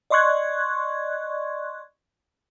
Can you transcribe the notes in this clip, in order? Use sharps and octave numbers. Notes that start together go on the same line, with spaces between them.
D5 D#5 C6 C#6 F#6 G#6